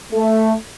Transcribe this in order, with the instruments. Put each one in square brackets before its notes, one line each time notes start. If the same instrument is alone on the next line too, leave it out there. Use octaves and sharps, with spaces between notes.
[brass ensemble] A3